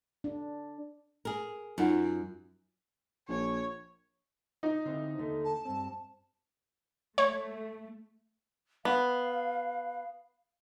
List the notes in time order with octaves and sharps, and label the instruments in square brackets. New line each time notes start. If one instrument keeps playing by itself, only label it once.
[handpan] D4
[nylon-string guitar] G#4 A#4
[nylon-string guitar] F#2 [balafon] D#4 F4 F#5
[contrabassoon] A#1 [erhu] C#5
[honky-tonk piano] D#4
[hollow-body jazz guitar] D3 C4 E4
D#2 D3 A3
[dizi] A5
[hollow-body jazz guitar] G2 C4
[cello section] A3 [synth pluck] C#5
[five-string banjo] B3 [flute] F5